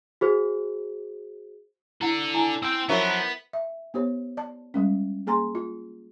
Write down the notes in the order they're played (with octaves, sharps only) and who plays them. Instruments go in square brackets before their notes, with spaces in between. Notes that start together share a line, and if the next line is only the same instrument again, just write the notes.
[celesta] F#4 G#4 C5
[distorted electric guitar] D4 A4 [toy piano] E4 F#5
[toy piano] E4 G#5 A#5
[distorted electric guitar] C4 G5 [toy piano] E6
[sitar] F3 F#3 F#4 [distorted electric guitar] B3 [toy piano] A#4 E5
[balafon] E5
B3 D#4 G4 C5 C#5
D5 A5
G3 G#3 C#4
A#3 G#4 G#5 A#5 C6
F4